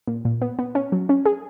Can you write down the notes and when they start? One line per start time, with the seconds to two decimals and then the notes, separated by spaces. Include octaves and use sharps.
0.07 A#2
0.25 A#2
0.42 B3
0.59 B3
0.75 C#4
0.92 F#3
1.09 C#4
1.25 G#4